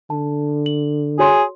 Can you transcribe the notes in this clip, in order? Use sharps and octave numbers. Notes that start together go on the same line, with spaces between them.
D3 A5
F#7
F#4 G#4 C#5 C6